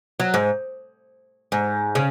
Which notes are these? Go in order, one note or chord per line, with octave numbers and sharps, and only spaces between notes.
F#3
G#2
G#2
C#3